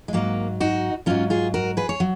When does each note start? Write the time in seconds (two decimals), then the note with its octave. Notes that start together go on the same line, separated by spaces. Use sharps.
0.08 G#3
0.13 G#2 F#3 A#3
0.60 D#4 F#4
1.06 G#2 F#3 C#4 F4
1.30 F4 G#4
1.54 F#4 A#4
1.77 G#4 B4
1.89 C#5
2.00 F#3